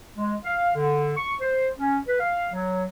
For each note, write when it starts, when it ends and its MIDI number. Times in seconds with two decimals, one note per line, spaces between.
0.17 0.34 56
0.44 0.70 77
0.75 1.13 50
1.17 1.34 85
1.41 1.68 72
1.78 1.98 61
2.07 2.17 71
2.19 2.47 77
2.52 2.84 54